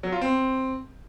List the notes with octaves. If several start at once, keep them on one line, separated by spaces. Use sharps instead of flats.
F#3
F4
C4